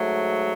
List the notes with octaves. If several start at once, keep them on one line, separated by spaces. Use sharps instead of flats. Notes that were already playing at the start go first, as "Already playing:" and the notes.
Already playing: G#2 F#3 A3